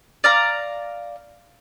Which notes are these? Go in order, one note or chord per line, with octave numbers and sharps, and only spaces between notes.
D5 F5 A#5